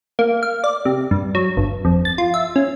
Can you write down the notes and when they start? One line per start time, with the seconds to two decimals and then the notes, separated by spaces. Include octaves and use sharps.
0.19 A#3
0.43 F5
0.64 D5
0.85 C3
1.11 G2
1.35 F#3
1.57 G1
1.85 F2
2.05 A6
2.18 F4
2.34 E5
2.56 C#4